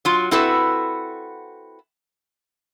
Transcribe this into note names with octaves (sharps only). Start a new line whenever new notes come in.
F#3 F4
C4 E4 F#4 A4 B4